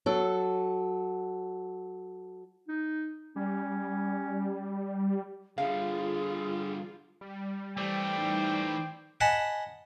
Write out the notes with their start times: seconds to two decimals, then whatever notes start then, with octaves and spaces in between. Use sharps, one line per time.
0.06 F#3 A4
2.69 D#4
3.36 G3 C#4
5.58 D3 G3 F4 G#4 F5
7.21 G3
7.77 E3 A3 C5 D5 G5
8.17 D#4
9.21 D#5 F#5 G#5 A5 B5